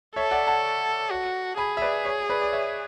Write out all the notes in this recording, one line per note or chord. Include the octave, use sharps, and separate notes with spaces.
A4 C#5 E5
D5 F#5
F#5 A5
F#4
G#4 G#5 B5
E5
B4 D5
C#5
B4 D5
D5
C#5 E5